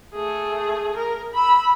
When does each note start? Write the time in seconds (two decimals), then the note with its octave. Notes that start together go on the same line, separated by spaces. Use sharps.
0.14 A3 G#4
0.97 A#4
1.34 B5 E6